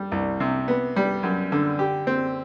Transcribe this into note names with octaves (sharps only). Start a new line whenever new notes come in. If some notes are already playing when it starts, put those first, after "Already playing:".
Already playing: G3
C2
C3
B3
G3
F#2
D3
G4
C4